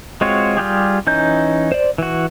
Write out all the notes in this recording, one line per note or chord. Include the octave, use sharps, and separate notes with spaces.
G#3 C4 F4 F#4 C#5
G3 F4 G4 G#4
E3 C#4 D#4 G6
C5 D5
E3 F#4